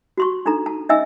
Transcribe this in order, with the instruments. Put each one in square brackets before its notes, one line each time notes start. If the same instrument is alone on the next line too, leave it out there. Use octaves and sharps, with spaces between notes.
[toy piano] F#4 C6 C#6
D4 D#4 A4 A#5
A5
C#4 D#4 D#5 E5 G#5 E6